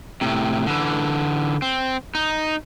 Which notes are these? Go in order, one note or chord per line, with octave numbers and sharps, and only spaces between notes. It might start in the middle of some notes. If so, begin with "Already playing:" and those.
A2 C3
D3 E3
C4
D#4